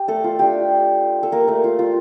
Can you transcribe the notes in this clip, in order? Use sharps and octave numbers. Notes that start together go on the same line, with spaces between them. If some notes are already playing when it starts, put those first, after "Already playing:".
Already playing: G4
A3 A4
F4
A3 D4 F4 G4
A4
A#3 A#4
A3 A4
F4
F4